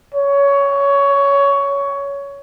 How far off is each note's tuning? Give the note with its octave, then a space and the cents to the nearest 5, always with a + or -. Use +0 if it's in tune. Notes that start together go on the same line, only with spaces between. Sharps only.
C#5 +15